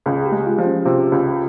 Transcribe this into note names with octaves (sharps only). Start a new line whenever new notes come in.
C#2 G#4
G4
G#3
F4
F3
C#4
C3 F4
C#2